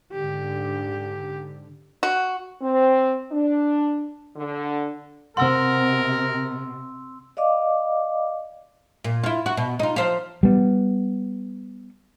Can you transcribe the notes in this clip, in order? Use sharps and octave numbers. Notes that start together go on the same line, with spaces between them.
G#2 D3 G4
F#4
C4
D4
D3
C3 C4 A#4 F#5 C6 E6
D5 D#5 F5 D6
A#2
E4 F4
F#4
B2
D#4 F4
F3 C5 F5
G3 B3